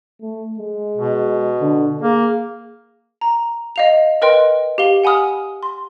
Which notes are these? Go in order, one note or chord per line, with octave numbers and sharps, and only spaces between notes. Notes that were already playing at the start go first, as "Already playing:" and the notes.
A3
G#3
B2
D3
A#3 G#4
A#5
D#5 F5 F7
A#4 B4 D#5 G5 C6
G4 F5 G7
F#5 G#5 B5 D#6 F6
C6